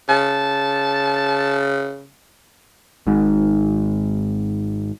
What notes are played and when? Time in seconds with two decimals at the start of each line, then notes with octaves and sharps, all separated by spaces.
0.09 C#3 A5
3.07 G#1 G#2